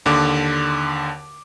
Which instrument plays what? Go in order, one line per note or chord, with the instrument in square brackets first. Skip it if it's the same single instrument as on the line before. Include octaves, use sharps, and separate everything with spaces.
[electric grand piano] D#2 D3 D6